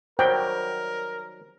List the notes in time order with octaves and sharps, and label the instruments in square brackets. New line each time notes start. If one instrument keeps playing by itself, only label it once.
[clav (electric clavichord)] D#3 F#3 G3 [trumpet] A#4 [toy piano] C5 [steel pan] G5